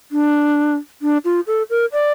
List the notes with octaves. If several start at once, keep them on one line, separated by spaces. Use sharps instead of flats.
D4
D4
F4
A4
A#4
D5